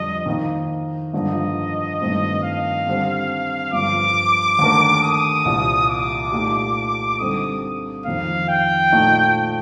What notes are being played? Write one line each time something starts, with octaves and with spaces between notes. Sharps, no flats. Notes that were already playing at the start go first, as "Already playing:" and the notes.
Already playing: F2 D3 G3 D4 D#5
D#3 A#3 D#4
G2 D3 F3 A#3 D#5
G2 D#3 A3 C4 F4
F5
D3 G3 C4
G2 D3 F3 D6
D#2 D3 A3 D#4 A#4
D#6
C2 A#2 G3
D6
A#2 A3 D#4 G4
D3 G3 C4 D#4 A4 D#6
F2 D#3 A#3 F5
G5
A#2 A3 D#4